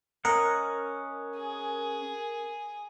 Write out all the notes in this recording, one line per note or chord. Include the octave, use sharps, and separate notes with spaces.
C#4 A#4 D#5 F#5
G#4